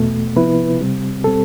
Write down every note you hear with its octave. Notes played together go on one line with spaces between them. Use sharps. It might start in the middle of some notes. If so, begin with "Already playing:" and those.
Already playing: E2 B2 A3
C3 F3 B3 E4 B4
C3 G3 C4
B2 G3 C4 A4